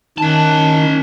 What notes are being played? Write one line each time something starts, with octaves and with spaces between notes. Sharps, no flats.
D#3 C#4 A5